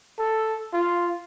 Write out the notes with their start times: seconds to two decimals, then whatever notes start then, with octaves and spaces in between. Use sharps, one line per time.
0.19 A4
0.73 F4